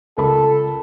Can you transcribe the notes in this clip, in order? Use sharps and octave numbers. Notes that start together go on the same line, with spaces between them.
C#2 A4 A#4 B5